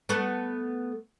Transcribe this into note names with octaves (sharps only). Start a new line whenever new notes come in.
A3 B3 B4